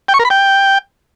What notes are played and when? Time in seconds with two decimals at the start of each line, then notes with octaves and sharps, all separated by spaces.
0.08 G5
0.14 C#6
0.19 A#4
0.25 B5
0.30 G5